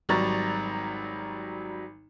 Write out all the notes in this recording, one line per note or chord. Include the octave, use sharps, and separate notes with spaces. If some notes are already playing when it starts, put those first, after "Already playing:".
G#1 F#3 G3 A#5 C#6 A6